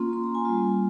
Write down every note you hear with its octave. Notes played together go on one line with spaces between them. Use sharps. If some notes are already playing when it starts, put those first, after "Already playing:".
Already playing: A#3 C#4 F4 C6
C6
A#5
G#5
G3 A#3 F4